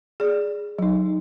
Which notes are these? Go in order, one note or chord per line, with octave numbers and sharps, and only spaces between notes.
G#4 D5
F#3 D#4